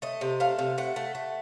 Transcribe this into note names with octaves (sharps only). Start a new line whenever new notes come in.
A3 D#5
C3
A3 F5
C3
A3 F#5
A3
A3